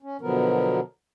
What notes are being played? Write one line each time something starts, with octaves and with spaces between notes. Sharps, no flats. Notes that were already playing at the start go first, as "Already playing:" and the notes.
C#4
B2 D3 F3 F#3 B3 A#4